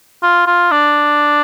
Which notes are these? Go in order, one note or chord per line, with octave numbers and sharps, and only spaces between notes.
F4
F4
D4